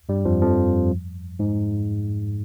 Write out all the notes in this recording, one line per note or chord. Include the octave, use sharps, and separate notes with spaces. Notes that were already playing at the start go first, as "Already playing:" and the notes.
G2 G3
F2 F3
F2 F3
G#2